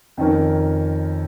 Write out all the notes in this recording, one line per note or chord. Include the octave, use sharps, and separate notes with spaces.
F2 D#3 C#4 A#4